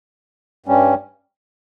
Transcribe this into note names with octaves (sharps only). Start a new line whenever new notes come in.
G2 G3 C#4